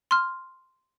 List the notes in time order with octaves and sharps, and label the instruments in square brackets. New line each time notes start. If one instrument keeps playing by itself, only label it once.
[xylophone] C6 F6